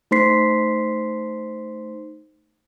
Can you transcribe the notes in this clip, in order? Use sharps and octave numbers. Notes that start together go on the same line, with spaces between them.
A3 D#4 C5 C6 B6 C7